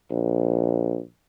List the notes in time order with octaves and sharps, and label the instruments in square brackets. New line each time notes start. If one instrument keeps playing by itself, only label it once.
[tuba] A#1